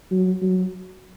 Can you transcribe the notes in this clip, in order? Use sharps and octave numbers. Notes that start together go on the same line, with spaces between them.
F#3
F#3